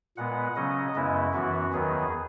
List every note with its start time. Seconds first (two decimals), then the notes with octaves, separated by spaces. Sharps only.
0.17 A#2 G#3 B3 F#5
0.56 C#3 F#3 C#4 D#5
0.95 F#2 C#3 G#3 B3 E4
1.34 F#2 E3 B3 F#4
1.73 E2 D#3 F#3 B3 G#4